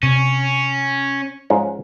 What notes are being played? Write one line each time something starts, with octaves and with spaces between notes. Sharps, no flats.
C3 C#4
G#2 F3 C#4